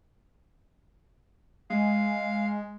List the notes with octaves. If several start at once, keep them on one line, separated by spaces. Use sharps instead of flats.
G#3 F5